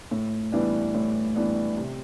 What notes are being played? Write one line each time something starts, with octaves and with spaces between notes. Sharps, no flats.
A2
E3 G3 B3 D4
A2
E3 G3 B3 D4
C3